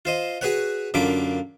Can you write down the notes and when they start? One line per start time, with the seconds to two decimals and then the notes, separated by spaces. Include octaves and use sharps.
0.05 F4 C5 D#5
0.41 F#4 G#4 B4 C#5 F#5
0.94 F#2 D3 A#3 F4 B5 D6